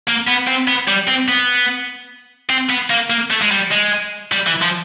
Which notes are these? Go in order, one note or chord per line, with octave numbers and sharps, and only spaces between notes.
A#3
B3
C4
B3
G3
C4
B3
C4
B3
A#3
A#3
A3
G#3
G3
G#3
G3
E3
F3